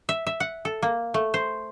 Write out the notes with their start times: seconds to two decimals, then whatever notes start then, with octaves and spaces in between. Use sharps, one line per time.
0.09 E5
0.27 E5
0.40 F#5
0.65 A4
0.82 A#3
1.14 A3
1.34 C5